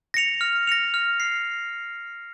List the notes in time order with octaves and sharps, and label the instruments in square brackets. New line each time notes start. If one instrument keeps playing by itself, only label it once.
[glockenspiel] A#6 C#7 F7
F6
A#6 C#7 F7
F6
C7